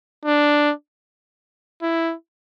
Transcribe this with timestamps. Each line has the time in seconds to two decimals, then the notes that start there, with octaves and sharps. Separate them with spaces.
0.25 D4
1.82 E4